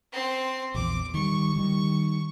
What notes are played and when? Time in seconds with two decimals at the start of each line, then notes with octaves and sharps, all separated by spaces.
0.13 C4 C6
0.74 A#1 E2 D6
1.14 D#3 G3 C#6
1.56 D#3 G3